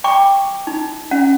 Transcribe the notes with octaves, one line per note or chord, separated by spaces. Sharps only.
G5 C#6 D6
D#4
C#4 F#5